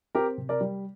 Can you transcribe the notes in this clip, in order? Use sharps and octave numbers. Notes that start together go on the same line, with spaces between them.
C4 G4 A#4
C3
A#4 D5
G3